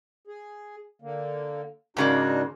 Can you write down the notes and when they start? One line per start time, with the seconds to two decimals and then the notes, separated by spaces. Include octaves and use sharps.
0.27 G#4
1.02 D3 A#3
1.97 G#2 C#3 A#3 D4 D#4 F#4